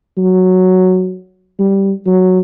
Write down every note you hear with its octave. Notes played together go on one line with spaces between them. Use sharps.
F#3
G3
F#3